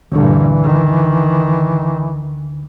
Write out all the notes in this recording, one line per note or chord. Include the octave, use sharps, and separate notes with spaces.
D2 G2 A#2 D3 E3
D#3